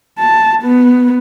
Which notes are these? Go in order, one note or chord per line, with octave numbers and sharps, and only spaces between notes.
A5
B3